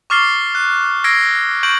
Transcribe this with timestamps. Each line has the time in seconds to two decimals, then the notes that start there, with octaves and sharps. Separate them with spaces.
0.10 C#6 D6 F6 A6 C7 G7
0.55 F#6
1.04 E6 G#6 A#6 C7 D7
1.63 C#6 G6 D7 F#7